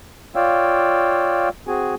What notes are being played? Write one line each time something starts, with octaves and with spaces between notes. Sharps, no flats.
F4 C#5 D5 F5 G5 E6
C4 F#4 G#4 G#5